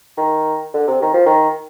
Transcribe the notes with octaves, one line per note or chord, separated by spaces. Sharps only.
D#3
D3
C3
D#3
F3
D#3